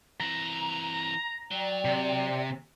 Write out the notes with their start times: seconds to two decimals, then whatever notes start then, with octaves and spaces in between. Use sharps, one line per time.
0.20 E3 C4 A#5
1.51 F#3 D5 G5
1.85 C3